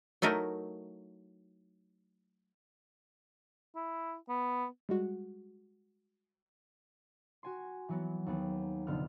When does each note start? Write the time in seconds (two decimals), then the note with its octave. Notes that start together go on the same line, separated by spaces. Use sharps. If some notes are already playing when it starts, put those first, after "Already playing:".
0.22 F#3 A3 D#4 E4 A#4
3.76 E4
4.29 B3
4.89 G3 G#3 F#4
7.43 F#4 G#5 C6
7.89 E3 F#3 B3
8.26 D#2 B3 G#4
8.87 F1 A#1 D3 B3 F4 F6